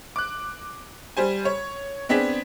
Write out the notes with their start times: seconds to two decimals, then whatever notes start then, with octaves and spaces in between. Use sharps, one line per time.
0.16 D6 F#6
1.17 G3 C5 G#5
1.45 C#5
2.09 B3 C4 D4 G#4 B6